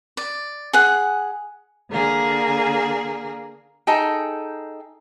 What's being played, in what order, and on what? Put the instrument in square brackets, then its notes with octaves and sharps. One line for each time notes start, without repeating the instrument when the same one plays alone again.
[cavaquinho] D5
G#4 F#5
[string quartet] D3 A#3 G#4
[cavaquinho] D#4 G#4 A4 G5